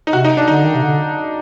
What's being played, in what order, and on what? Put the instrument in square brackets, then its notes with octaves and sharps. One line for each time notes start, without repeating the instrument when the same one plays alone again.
[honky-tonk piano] D#4
[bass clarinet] C3 [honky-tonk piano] F#4
[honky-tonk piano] D#4
D4
[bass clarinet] D3 [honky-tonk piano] D#4
[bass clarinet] D#3
C3
D3